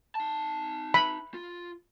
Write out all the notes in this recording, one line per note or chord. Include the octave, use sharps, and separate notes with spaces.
D#4 A5
B5
F4